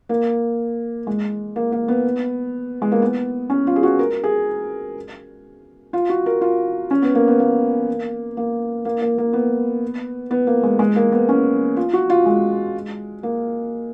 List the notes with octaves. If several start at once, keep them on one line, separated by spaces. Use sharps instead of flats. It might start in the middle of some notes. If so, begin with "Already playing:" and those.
A#3
G#3
A#3
A#3
B3
G#3
A#3
B3
C#4
F4
G#4
F#4
A#4
G#4
F4
F#4
A#4
F4
C#4
B3
A#3
B3
A#3
A#3
A#3
A#3
A#3
B3
B3
A#3
G#3
G#3
A#3
B3
C#4
F4
F#4
F4
G#3
A#3